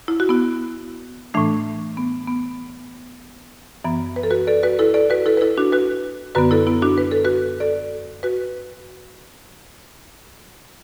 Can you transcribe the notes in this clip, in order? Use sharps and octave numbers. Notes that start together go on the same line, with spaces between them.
E4
F#4
B3 E4
A2 E3 A3 D4
B3
B3
F#2 E3 B3
B4
A4
F#4 B4
A4 D5
F#4 B4
E4 A4
A4 D5
F#4 B4
E4 A4
B4
E4 A4
D4 F#4
F#4 B4
F#2 D3 B3 F#4 B4
E4 A4
B3 E4
D4 F#4
B4
A4
F#4 B4
A4 D5
F#4 B4